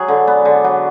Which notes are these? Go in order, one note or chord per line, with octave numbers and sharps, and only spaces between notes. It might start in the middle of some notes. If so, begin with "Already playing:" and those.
Already playing: F#3 G#4
D3
B3
D3
F#3